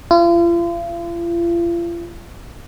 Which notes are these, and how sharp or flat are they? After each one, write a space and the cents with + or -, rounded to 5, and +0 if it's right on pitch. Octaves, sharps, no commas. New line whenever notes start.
F4 -40